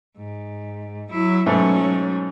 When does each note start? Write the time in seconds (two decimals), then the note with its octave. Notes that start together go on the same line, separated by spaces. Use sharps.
0.17 G#2
1.11 F#3 E4
1.46 G#2 B2 F#3 A3 C#4